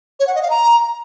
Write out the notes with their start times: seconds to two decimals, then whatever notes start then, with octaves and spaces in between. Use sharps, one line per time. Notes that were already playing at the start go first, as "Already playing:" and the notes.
0.20 C#5
0.27 F#5
0.35 D#5
0.42 F5
0.50 A#5